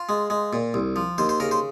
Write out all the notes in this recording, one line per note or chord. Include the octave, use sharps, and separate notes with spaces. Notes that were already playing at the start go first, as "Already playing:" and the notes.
Already playing: F4
G#3
G#3
A#2
C2
F3
D#2 C5
C5
C#3 A#4
C5